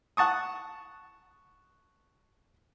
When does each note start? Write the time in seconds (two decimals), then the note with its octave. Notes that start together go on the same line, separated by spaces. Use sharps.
0.17 F#5 A5 C#6 D#6